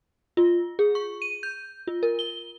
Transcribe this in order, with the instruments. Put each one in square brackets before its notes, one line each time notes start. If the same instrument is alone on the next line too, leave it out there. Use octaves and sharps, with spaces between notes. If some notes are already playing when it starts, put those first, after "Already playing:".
[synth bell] F4
G#4
C#6
D#7
G6
F4
A#4
G7